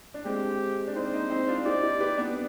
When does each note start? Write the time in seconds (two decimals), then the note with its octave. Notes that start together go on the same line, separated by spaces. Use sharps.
0.14 D4
0.25 G#3 C4 G4
0.87 D4
0.95 C4 D#4 C5
1.13 C4 D#4
1.30 C4 D#4
1.48 D4 F4
1.65 D#4 G4 D5
1.83 D#4 G4
2.00 G4 B4
2.17 B3 D4